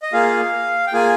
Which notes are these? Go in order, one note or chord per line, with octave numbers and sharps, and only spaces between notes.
D#5
A#3 F4 G#4 F5
G5
A#3 F4 G#4 G#5